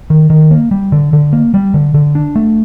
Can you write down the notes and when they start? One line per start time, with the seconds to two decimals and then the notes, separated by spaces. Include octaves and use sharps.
0.10 D#3
0.30 D#3
0.51 A#3
0.71 G3
0.92 D3
1.13 D3
1.33 A#3
1.54 G3
1.74 D3
1.94 D3
2.15 D4
2.36 A3